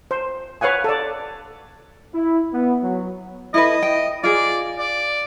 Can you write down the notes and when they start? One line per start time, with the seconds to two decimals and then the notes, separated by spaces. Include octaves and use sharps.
0.11 C5
0.61 B4 C#5 F5 F#5 G#5
0.84 A4 D5
2.15 E4
2.53 B3
2.83 F#3
3.54 E4 A4 B4 D#5
3.83 G5
4.23 F4 G#4 D5
4.79 D5